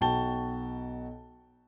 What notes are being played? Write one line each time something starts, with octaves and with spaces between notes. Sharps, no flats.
B1 F#4 G5 A5 G7